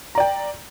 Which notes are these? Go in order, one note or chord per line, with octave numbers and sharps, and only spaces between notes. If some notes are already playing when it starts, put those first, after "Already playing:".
D5 G5 A#5